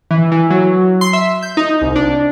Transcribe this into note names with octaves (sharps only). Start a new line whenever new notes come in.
E3
E3
F#3
C6
E5
G6
D#4
C2
D4